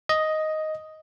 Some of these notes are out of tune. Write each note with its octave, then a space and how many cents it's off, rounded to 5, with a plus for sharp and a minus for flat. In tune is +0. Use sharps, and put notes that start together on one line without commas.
D#5 +5